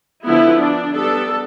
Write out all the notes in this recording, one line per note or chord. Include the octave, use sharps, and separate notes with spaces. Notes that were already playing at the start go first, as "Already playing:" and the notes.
D3 F3 B3 E4
D4
G3 B3 D4 A4